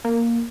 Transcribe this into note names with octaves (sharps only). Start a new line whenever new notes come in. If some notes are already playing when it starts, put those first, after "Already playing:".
A#3